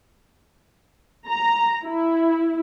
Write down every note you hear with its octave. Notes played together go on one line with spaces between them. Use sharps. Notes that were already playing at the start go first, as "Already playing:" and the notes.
A#5
E4